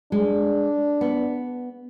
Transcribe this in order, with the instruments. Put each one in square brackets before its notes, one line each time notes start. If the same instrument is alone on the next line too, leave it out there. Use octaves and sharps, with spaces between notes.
[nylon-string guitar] G#3 [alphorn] D4
[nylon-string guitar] B3